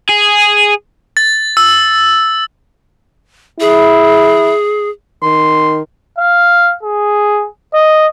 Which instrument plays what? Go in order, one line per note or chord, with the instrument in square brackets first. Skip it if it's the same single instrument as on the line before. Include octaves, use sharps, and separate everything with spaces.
[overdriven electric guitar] G#4
[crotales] A6
E6
[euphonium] E4 [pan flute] G#4
[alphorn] D#3 [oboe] C6
[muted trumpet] F5
G#4
D#5